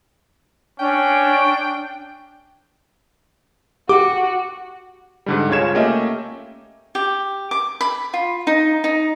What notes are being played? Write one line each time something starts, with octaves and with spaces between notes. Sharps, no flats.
C#4 D4 G5
F#4 G4 D6
G#2 D3 G3
C#2 C#3 F4 C#5 G#6 E7
A3 A#3 C#4 G4 D#5 E5
G4
D6
B5
F4
D#4
D#4